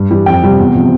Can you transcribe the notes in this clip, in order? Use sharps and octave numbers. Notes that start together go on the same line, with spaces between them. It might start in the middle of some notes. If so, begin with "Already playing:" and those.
Already playing: G2
E3 G3
F2 G5
C3 G3
E2
C3 F3